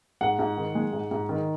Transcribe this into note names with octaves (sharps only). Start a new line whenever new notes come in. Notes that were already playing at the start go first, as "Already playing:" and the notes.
G#2 F#5
G#2
D#3
G#3
G#2
G#2
D#3